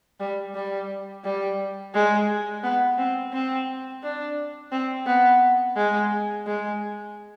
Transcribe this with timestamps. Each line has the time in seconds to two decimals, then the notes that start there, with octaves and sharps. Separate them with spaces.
0.20 G3
0.54 G3
1.24 G3
1.94 G#3
2.63 B3
2.98 C4
3.33 C4
4.03 D4
4.72 C4
5.07 B3
5.76 G#3
6.46 G#3